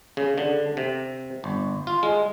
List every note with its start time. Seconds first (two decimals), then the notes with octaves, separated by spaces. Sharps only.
0.17 C#3
0.38 D3
0.77 C3
1.44 G1
1.87 F4
2.03 G#3